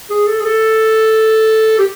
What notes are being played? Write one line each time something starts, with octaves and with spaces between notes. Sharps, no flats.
G#4
A4
G#4
A4
G4